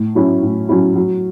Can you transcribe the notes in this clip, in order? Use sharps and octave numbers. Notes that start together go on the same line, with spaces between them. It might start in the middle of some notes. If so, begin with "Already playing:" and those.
Already playing: A2
F#3 C#4 E4
A2
F#3 C#4 E4
F#3